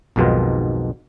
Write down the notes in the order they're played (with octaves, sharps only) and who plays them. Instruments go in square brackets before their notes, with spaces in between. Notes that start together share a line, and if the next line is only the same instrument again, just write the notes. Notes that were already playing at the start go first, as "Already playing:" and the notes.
[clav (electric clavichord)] B1 F2 G#2 B2 D#3 F4